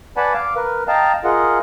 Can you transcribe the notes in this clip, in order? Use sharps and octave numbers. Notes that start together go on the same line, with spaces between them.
B4 D5 F#5 G#5 A5 B5
F5 D6
A#4 B4
D#5 F5 G5 A5 A#5
F4 G#4 A#4 D#5 F#5